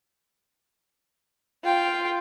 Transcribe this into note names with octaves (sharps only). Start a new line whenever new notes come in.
F4 G5